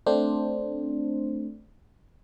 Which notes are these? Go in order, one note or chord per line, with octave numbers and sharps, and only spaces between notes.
A3 C4 D4 C5